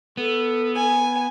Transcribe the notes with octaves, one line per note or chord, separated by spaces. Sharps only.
B3 A4
G#5